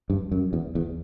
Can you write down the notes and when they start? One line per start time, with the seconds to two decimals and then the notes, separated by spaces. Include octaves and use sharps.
0.10 G2
0.32 F#2
0.53 E2
0.75 E2